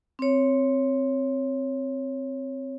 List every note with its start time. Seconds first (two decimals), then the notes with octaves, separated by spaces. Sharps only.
0.19 C4 C#5